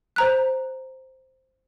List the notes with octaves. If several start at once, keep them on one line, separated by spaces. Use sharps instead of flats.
C5 A#5 F#6